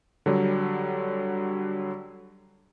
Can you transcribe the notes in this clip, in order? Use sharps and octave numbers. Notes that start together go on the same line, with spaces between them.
D3 F#3 G3